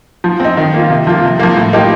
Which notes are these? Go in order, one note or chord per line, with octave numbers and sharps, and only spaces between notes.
F3
C4 D#4
D#3
A#3 F4
C3
F3 A#3 F4
C3
F3 A#3
A2
F3 A#3 D#4 G4